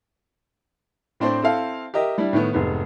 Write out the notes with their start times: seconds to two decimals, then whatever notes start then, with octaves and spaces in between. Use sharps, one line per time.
1.20 A2 C4 D4 C5 D5
1.42 C4 E4 A4 F5
1.94 G4 A#4 D#5 E5
2.18 G3 D4 E4
2.33 A2 D#3 B3
2.53 F1 G#2 B3